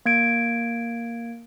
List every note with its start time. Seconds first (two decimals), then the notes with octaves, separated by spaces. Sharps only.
0.06 A#3 G#6 D7